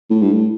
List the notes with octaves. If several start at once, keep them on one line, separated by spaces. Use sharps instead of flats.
A2
G2
A2